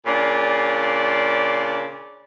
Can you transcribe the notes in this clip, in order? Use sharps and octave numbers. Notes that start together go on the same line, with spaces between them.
A#2 C#3 D4 D5